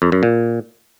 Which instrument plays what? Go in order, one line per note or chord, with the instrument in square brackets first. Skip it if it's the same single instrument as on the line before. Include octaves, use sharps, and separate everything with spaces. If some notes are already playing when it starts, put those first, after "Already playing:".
[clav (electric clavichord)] F2
F#2
A#2